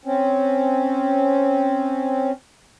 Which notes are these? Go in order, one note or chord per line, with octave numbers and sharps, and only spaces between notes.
C4 C#4